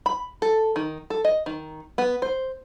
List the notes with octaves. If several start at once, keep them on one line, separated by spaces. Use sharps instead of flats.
B5
A4
D#3
A4
D#5
D#3
B3
C5